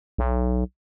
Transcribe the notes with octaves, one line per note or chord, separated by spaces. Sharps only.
B1